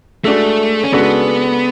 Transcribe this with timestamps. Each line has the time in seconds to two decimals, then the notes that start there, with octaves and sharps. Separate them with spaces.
0.24 G#3 A3 D4 F#4 A4
0.83 C#4
0.92 C#3 G#3 B3 D4 F#4 A4